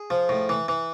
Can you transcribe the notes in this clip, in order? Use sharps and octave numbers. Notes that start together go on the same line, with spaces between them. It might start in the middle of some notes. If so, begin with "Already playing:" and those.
Already playing: G#4
F3
A2
E3
E3